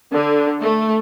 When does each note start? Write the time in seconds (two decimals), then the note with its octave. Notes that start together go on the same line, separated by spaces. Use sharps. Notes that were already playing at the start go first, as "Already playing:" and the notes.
0.12 D3
0.60 A3